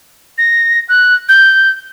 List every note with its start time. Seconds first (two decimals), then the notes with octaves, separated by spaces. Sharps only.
0.38 A#6
0.89 F#6
1.29 G6